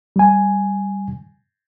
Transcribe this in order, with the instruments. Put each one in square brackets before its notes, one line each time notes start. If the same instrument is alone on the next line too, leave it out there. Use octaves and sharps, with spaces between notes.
[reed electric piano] G3 G#5